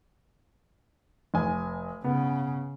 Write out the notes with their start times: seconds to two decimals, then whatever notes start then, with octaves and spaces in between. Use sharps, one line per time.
1.34 F1 G#5
2.04 C#3 B3